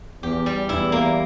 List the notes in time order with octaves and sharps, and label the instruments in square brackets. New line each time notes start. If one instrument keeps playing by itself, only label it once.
[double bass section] E2 [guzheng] G4
[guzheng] G3
[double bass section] E2 [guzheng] E4
[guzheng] A#3